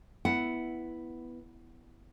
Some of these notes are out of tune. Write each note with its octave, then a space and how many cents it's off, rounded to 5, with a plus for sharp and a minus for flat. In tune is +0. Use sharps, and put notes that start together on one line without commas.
B3 +0 E4 +0 F#5 +5